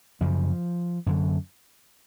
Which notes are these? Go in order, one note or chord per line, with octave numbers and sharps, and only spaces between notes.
F#2 C#3 F3
F#2 D3